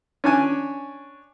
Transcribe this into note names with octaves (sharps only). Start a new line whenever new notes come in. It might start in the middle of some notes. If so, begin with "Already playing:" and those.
C#4 D4 G#5